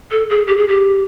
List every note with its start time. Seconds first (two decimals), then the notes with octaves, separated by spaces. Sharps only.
0.11 A4
0.30 G#4
0.47 G4
0.57 G#4
0.68 G4